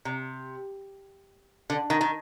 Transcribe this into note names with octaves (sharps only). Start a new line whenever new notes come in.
C3
D3
D#3
D#3